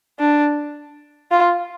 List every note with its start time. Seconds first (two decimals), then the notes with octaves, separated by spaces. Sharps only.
0.20 D4
1.31 F4